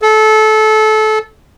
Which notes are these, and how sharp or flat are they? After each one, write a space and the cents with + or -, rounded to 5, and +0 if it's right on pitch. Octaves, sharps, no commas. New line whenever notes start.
A4 -25